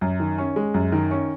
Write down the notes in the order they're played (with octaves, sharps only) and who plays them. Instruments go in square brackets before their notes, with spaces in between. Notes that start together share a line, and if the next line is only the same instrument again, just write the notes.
[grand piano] F#2
D#3
C#4
G#3
F#2
D#3
C#4